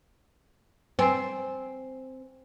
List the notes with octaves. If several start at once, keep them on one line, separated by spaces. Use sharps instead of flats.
C4 C5 G#5